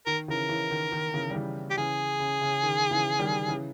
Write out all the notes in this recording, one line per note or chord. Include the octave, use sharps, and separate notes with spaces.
D#3 A#4
C#3 E3 A#4
C#3 E3
D#3
D#3
C#3 E3
G3
C#3 E3
G4
C#3 E3 G#4
C#3
C#3
D#3
C#3 E3
D#3 G3
C#3 E3